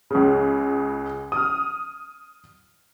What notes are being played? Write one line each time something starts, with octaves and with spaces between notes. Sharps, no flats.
C#2 C#3
D#6 F6